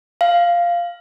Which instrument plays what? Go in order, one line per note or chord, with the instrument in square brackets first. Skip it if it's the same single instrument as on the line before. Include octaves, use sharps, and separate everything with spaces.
[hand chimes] F5